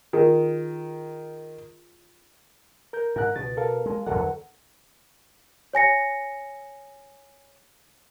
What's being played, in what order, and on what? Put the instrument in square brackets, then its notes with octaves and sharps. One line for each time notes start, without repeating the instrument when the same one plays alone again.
[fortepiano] D#3 [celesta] F4 G#4
[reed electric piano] A#4 G6
[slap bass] G#2 [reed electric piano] A#4 F#6
[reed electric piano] C#2 A6 [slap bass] B2
[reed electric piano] A4 A#4 F5
[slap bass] G#3
[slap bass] E2 D3 F#3 [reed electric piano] A4 A#4 F#5
[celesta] C#5 G#5 A#6 C#7